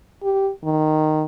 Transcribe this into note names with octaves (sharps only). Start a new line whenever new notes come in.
G4
D#3